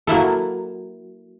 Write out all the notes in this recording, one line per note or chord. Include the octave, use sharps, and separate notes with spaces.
F#3 A#3 E4 A4